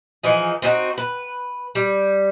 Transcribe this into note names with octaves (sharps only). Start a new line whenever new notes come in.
E3 F3 D#4 G#4
C4 D#4 F#4
B4
G3